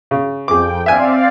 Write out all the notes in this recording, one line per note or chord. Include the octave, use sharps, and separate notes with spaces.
C#3
F2 G#4 G5 D6
C4 D5 E5 F5 G#5